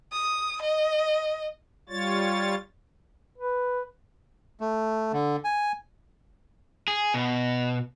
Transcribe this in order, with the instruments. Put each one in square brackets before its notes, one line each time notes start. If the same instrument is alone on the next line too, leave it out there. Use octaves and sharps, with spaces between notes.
[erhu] D#6
D#5
[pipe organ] G3 F4 C#5 A6
[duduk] B4
[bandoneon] A3
D3
G#5
[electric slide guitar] G#4
B2